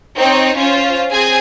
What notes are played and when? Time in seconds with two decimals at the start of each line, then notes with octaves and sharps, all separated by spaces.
0.17 C4 D#4 C#5
0.57 C#4 F4 C5
1.10 C4 G#4 G#5 G#6